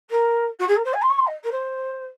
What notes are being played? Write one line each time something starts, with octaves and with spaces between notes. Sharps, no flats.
A#4
F#4
G#4
A#4
C5
G#5
C6
C#6
C6
D#5
A#4
C5